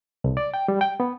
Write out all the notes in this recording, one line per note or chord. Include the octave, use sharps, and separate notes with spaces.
C2
D5
G5
G3
G5
B3